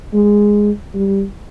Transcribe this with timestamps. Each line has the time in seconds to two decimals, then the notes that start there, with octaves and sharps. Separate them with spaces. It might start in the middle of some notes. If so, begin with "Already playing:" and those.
0.14 G#3
0.94 G3